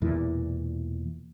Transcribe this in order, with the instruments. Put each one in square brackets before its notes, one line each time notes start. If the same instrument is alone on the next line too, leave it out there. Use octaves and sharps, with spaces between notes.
[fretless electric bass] E1 E2 A#2 E3